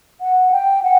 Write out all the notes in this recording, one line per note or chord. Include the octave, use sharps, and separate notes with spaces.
F#5
G5
F#5